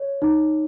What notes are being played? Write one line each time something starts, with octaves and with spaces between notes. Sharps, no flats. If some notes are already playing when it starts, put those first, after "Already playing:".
Already playing: C#5
D#4